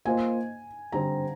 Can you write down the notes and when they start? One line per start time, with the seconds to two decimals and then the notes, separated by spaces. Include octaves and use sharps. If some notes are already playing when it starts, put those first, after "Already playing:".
0.05 A#3 F4 C5 D#5 G#5
0.92 D3 G3 C4 G4 C5 A#5